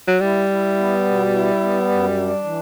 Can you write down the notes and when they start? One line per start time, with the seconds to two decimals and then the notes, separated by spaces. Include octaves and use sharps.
0.08 F#3
0.21 G3 E4
0.49 E4
0.77 B3
1.05 B2
1.33 E4
1.61 B3
1.88 F#2
2.17 D4
2.44 E3